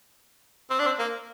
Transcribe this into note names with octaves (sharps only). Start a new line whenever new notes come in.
C4
D4
C4
A#3